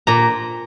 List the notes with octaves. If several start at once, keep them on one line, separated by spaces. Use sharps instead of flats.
A#2 A#5